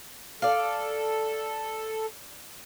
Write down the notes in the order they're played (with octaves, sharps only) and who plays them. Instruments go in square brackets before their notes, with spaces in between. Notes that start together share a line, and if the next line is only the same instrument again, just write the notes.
[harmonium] A4 [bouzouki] D5 F5